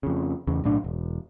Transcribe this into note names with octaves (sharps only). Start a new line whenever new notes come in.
F2 C#3
E2 C#3
B1 A2 D4
E1